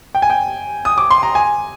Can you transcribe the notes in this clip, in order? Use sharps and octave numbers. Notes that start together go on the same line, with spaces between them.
G5
G#5
G5
D#6
D6
C6
A#5
G#5